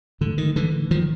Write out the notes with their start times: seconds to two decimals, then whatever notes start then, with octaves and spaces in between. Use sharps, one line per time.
0.21 A2 D3
0.38 D#3
0.56 D3 E3
0.91 D#3 F3